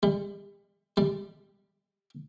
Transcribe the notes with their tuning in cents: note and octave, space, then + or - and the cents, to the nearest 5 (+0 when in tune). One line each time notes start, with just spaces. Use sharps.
G3 +35
G3 +5